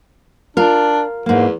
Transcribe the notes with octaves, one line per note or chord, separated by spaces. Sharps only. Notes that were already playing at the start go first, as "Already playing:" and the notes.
D4 F4 A#4
E2 G#2 A#3